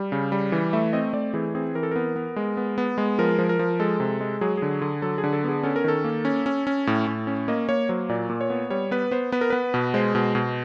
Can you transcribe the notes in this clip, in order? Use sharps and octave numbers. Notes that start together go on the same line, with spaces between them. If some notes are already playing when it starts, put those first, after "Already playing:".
Already playing: G3
C#3
G3
E3
A3 E5
C4 D#5
A3 D5
E3 G#4
C4 G#4
E3 A#4
A4
B3 A#4
B3
G#3
B3
B3
G#3
F3 A#4
F3
A#4
F3
G#3 A4
C3
G#3
F#3 G#4
D3 G#4
D3
F#3 A4
G#4
D3
A4
B3 G#4
C#4 A4
A#4
D#3 A4
A#3
C#4
C#4
C#4
A2
A2
C#4
A#3 D#5
A#3 C#5
F#3 C5
A#2 D5
A#2
C#5
B3
G3 C#5
B3 B4
B3 C5
B3 B4
A#4
B3 B4
B2
G#3 C5
B2
B2